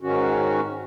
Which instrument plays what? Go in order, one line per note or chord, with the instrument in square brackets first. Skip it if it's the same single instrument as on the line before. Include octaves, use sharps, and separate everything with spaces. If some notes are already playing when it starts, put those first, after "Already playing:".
[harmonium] G#2 D#3 C#4 F#4